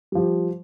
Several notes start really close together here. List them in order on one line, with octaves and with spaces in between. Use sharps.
G3 F3 G4